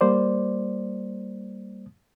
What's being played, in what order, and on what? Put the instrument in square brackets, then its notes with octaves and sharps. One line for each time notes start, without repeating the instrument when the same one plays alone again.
[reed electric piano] G3 A#3 C5 D5